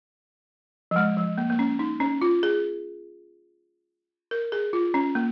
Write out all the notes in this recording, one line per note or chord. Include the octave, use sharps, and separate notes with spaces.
F3
G#3
F3
A#3
A#3
C#4
D#4
C#4
F4
G#4
A#4
G#4
F4
C#4
A#3